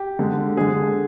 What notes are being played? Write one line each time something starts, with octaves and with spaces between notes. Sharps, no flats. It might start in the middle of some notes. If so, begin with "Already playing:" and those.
Already playing: G4
D3 G#3
D3 G#3 G#4